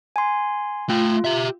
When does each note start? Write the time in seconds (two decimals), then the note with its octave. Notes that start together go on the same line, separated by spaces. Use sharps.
0.16 G#5 C6
0.90 A3 F4 G5
1.24 G4 E5